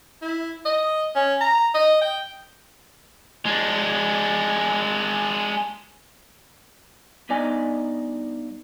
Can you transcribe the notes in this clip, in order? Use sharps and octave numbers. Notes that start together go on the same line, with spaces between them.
E4
D#5
C#4
A#5
D#5
G5
G#3 D4
G2 B3 D#4 D5 G#5